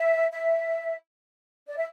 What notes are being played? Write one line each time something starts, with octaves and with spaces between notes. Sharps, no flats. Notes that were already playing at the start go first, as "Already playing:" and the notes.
Already playing: E5
E5
D5
E5